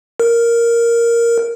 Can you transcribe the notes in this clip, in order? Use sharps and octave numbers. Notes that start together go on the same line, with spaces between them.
A#4